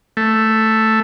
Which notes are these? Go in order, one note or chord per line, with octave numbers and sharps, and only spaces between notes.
A3